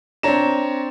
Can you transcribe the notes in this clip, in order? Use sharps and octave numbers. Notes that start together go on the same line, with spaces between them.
C4 D4 C#5 A#5 E7